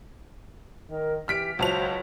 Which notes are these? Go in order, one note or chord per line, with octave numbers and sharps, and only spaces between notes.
D#3 A#4
E3 G4 F6 B6 D7
C#2 F#3 F#4 C5 A5 F7